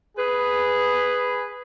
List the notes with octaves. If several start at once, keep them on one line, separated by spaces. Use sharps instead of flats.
G#4 B4